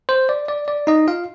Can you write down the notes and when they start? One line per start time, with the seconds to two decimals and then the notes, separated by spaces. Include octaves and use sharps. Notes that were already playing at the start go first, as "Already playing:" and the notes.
0.09 C5
0.29 D5
0.48 D5
0.68 D5
0.87 D#4 D#5
1.08 F4 F5